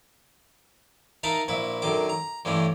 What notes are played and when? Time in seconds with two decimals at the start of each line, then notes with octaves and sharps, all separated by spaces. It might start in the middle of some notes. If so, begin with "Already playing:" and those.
1.23 D#4 A#4 E5 F5 A5 B5
1.48 A#1 A#2 E4 B4
1.82 F#2 D3 D#3 D6
2.09 A#5
2.45 G2 D3 E3 A3 C#4